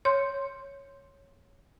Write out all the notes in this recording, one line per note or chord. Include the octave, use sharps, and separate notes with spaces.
C#5 C6 G6